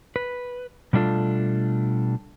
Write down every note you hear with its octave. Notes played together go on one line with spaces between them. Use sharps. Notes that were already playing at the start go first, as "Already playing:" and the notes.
B4
B2 G3 A3 D4 F4 A4